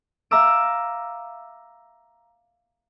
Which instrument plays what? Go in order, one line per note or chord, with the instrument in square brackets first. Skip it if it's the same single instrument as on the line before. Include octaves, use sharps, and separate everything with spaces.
[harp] E5 F5 A#5 D6 E6 D7